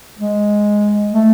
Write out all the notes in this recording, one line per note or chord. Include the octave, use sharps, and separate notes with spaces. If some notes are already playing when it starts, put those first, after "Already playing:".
G#3
A3